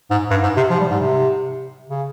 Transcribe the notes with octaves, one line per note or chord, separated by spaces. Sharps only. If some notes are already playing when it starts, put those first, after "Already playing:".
G#2
G2
G#2
C3
F3
G3
G#2
C3
C#3